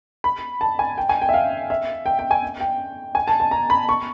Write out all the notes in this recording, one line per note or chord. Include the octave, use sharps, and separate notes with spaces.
B5
A5
G#5
G5
G#5
G5
E5
F5
E5
G5
G5
G#5
G5
G#5
A5
A5
A#5
B5
C#6